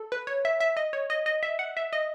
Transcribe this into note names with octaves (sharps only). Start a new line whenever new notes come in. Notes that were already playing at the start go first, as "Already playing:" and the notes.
Already playing: A4
B4
C#5
E5
E5
D#5
C#5
D#5
D#5
E5
F#5
E5
D#5